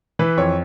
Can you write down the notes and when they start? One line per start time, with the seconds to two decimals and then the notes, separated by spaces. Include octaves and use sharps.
0.19 E3 B4
0.37 F2 C#5